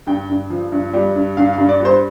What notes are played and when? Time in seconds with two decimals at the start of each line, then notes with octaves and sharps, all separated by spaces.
0.07 G2 G5
0.29 G2
0.50 F3
0.72 G2
0.93 G3
1.15 G2
1.37 G2 F5
1.53 F5
1.58 G2
1.69 D5
1.80 G3
1.85 C5